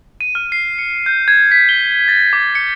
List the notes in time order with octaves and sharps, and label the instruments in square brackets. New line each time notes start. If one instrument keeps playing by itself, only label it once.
[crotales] D#7
F6
C7
C#7
G6
G#6
B6
G7
A6
D6
C#7